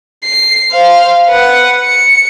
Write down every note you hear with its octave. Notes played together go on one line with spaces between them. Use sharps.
C7
C5 F5
B4 F#5
C#7